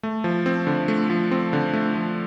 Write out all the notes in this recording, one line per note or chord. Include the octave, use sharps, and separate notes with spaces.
A3
F3
C4
D3
A3
F3
C4
D3
A3
F3